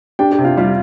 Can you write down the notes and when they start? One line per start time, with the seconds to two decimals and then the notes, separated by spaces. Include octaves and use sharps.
0.19 D4 G4 G5
0.32 G4 G5
0.38 C3
0.45 F4 F5
0.57 G3 F4 F5